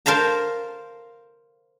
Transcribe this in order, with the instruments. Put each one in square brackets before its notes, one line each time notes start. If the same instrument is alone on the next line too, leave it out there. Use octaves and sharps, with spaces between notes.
[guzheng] A#4 C5 F5 A5 A#5